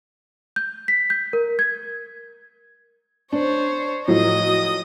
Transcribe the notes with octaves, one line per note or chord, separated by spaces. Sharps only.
G6
B6
G6
A#4
G#6
D4 C5 C#5
A2 F3 F#3 D#5 D#6